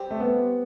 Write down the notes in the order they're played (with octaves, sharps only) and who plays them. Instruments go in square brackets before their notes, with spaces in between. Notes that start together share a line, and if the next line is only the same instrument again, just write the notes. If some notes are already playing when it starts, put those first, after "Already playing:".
Already playing: [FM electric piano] G3 C4 G4
[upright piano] A3
B3